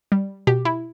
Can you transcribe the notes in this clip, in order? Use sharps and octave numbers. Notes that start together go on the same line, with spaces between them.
G3
B2 G4
E4